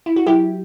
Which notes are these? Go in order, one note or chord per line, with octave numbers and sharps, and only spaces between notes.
E4
F#4
F#3 E4 G4